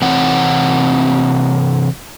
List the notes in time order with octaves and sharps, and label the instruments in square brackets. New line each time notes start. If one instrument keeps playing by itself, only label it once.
[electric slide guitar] C3 E3 C4 C#5 F#5